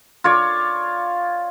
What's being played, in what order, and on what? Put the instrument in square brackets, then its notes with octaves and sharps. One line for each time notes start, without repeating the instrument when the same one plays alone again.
[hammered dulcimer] F4 C#5 D5